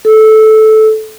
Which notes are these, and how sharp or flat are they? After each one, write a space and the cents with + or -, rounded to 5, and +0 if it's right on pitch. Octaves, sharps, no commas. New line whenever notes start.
A4 -15